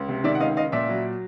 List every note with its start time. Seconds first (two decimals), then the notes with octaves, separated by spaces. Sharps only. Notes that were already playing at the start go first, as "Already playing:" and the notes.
Already playing: C#2
0.09 C3
0.24 D#3 D5 E5
0.35 F#5
0.40 C#2 D#5 F5
0.57 C#2 D#5 F5
0.72 A#2 D5 E5
0.89 F#3